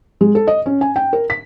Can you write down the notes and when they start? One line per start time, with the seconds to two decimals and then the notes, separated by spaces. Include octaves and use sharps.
0.21 G#3
0.35 A4
0.47 D#5
0.66 C#4
0.81 G#5
0.96 G5
1.13 A#4
1.30 B6